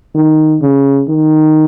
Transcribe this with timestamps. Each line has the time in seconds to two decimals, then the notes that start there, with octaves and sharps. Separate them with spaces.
0.15 D#3
0.62 C#3
1.08 D#3